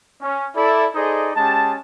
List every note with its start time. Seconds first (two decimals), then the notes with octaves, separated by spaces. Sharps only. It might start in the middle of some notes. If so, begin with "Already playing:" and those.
0.22 C#4
0.56 E4 A4 D5
0.95 D#4 G#4 A4 C5 D5 D#5
1.36 G#3 C#4 G4 A5